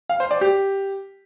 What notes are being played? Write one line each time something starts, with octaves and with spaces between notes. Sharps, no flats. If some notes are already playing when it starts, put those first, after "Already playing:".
F5
C5
D5
G4